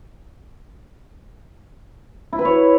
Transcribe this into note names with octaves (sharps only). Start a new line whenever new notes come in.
E4
B4
C#5